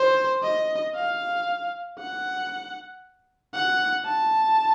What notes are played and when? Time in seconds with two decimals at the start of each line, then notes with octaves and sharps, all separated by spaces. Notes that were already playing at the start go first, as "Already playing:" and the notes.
Already playing: C5
0.43 D#5
0.95 F5
1.99 F#5
3.54 F#5
4.06 A5